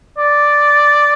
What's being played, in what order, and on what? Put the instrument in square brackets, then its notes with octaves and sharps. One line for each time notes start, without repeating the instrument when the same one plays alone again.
[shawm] D5